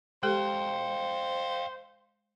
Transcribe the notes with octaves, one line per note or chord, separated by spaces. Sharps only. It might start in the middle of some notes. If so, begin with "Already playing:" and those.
G#3 G4 A4 C5 F5 G5